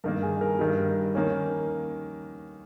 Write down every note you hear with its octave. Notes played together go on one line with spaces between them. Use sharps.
G2 D#3 A#3 A#4
G#4
A#4
G2 D#3 G3
D#3 A#3 C#4